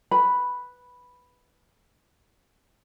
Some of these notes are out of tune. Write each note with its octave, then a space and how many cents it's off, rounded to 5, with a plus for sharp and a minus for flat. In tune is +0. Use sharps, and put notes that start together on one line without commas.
B4 +0 B5 +0